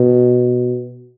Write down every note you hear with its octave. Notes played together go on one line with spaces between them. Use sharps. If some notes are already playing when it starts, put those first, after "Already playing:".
Already playing: B2